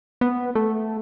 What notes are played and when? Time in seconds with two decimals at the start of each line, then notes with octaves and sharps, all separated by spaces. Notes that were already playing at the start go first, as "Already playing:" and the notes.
0.21 B3
0.55 A3